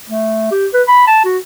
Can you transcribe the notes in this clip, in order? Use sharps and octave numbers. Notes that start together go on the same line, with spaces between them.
A3
G4
B4
B5
A5
F#4